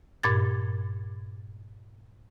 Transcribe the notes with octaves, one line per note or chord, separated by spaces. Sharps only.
G2 A#2 G#6 A6